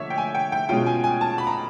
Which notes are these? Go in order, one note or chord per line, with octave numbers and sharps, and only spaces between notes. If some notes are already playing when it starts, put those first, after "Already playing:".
Already playing: D3 F3 A#3 C#5 E5
G5
G#5
G5
G5
B2 G#3 C#4 F4 G5
G#5
G#5
A5
B5
A#5